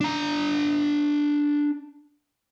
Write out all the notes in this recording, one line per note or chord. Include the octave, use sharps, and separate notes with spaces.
D4 A#5